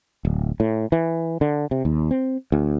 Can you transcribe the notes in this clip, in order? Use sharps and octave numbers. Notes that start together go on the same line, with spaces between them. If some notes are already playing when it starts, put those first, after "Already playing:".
D1
A2
E3
D3
C3
D#2
C4
D2